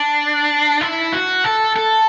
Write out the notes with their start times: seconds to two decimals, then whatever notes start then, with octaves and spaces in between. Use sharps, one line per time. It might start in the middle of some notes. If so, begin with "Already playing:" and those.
Already playing: D4
0.81 E4
1.13 F#4
1.44 A4
1.76 A4